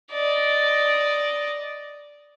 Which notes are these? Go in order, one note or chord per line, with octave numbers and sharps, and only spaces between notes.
D5 D#5